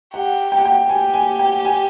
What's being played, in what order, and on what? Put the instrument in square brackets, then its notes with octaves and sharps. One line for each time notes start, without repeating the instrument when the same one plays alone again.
[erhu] G4 [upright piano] F#5
[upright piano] G5
F#5
G5
[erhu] G4 [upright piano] G#5
[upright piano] G#5
G5
G#5